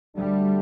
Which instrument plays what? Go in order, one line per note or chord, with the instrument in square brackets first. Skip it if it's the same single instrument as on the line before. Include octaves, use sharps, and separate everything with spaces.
[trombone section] D2 D3 A3 D4 [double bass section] G3